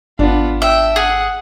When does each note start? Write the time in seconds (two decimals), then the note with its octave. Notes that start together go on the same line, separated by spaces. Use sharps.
0.19 G#1 B3 D4 F4
0.62 E5 G5
0.96 G#4 F#5